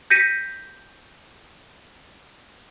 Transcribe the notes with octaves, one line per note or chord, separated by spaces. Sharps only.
G6 A#6 B6 C#7 D#7